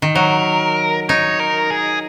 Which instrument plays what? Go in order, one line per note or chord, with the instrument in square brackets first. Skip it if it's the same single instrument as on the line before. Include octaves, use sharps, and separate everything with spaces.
[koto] D#3
[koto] F#3 [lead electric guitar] A#4
[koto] D#4 [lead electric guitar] C#5
[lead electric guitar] A#4
G#4